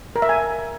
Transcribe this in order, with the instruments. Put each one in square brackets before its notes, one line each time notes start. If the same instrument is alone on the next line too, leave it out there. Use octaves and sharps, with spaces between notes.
[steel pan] A#4
E5
G#5